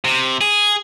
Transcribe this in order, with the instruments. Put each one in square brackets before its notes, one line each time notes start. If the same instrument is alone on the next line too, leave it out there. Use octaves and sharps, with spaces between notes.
[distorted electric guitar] C3
G#4